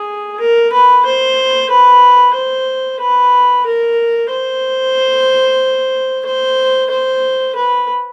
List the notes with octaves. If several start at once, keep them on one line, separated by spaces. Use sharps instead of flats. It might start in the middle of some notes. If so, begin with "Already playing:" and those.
Already playing: G#4
A#4
B4
C5
B4
C5
B4
A#4
C5
C5
C5
B4